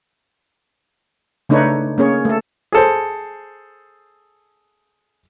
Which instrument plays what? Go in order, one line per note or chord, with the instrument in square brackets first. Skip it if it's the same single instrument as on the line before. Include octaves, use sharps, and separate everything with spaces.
[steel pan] C#3 A3 D4 D#4 B4 C#5
A#3 C#4 G#4 C#5
A3 A4
[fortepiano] G#4 A4 C5